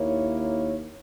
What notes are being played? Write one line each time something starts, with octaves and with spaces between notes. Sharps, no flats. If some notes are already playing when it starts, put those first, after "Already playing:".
Already playing: D#2 D#3 A#3 E4 C#5
C#5